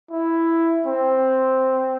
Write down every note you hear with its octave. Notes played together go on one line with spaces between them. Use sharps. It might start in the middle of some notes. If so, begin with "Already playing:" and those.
E4
C4